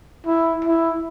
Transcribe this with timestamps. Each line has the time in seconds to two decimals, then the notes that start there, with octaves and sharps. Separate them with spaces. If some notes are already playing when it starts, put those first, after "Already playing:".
0.27 E4
0.64 E4